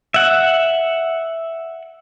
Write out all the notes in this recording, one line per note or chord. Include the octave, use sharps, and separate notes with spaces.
E5 F#5